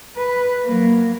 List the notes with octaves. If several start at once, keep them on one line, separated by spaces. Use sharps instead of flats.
B4
F#3 A#3